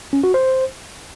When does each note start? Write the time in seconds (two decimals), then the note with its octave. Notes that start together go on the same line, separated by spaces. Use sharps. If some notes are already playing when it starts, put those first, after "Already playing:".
0.13 C#4
0.24 F#4
0.34 C5